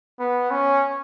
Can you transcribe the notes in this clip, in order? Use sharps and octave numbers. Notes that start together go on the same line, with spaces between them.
B3
C#4